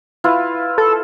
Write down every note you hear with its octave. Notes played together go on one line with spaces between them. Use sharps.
E4 F4 B4
A4